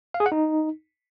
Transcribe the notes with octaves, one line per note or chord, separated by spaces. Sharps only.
F5
G#4
F#5
D#4